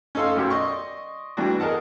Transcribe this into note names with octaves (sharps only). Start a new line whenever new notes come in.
C#4 D#4 A4 F5 C6
B1 F#2 G4 F#5 E6
D5 D#5 C6 C#6
E3 G3 B3 D4 F#4
G#4 A#4 D#5 F#5 A5